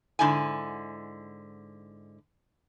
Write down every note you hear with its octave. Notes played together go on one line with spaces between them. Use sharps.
G#2 D3 E4 G#5